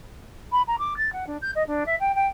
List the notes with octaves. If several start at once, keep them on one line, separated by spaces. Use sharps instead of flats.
B5
A#5
D6
A6
F#5
D4
G6
D#5
D4
E5
G5
G5